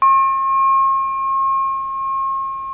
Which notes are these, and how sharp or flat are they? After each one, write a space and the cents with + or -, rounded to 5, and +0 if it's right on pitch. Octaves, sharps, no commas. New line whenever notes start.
C#6 -45